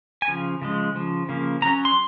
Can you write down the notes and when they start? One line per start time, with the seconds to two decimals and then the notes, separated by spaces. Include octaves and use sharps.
0.22 G#5
0.28 C#3 F3
0.62 C#3 F3 G#3
0.95 C#3 F3
1.29 C#3 F3 A#3
1.62 F#3 C#4 A#5
1.85 C6